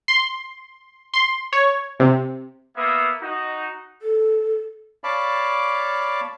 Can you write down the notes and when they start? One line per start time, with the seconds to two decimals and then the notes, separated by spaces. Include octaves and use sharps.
0.08 C6
1.14 C6
1.53 C#5
2.00 C3
2.76 A#3 B3 E5 D#6
3.21 D#4 F#4
4.02 A4
5.04 C#5 D5 F5 A5 B5 D6